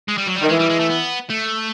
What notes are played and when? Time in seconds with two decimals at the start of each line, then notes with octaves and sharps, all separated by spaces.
0.08 G#3
0.18 G3
0.27 F#3
0.36 G3
0.42 D#3
0.49 E3 G#3
0.59 G3
0.69 G#3
0.79 A3
0.89 B3
1.30 A3